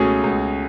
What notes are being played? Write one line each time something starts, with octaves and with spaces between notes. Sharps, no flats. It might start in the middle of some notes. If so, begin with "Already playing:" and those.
Already playing: C#2 B2 A3 C#4 G#4
C#2